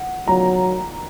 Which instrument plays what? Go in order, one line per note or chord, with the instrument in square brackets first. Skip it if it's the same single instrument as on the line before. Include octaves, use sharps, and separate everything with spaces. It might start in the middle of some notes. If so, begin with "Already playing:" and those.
Already playing: [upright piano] F#5
[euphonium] F#3 [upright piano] A#5